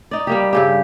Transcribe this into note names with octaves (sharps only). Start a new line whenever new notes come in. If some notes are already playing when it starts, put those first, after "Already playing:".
D#4 D5
G3 A#3 G4
G2 C#3 G4